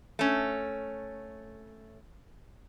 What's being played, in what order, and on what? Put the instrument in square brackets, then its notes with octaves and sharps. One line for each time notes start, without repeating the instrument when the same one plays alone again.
[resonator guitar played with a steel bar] A3 C#4